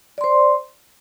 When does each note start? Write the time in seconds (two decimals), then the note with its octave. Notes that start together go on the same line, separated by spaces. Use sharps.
0.18 D5
0.21 C6
0.24 C5